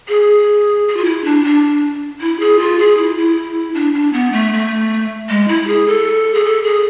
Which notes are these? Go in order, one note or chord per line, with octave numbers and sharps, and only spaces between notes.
G#4
G#4
F4
E4
D4
D4
E4
G#4
F4
G#4
E4
E4
D4
D4
B3
A3
A3
G#3
E4
G#4
A4
G#4
A4
G#4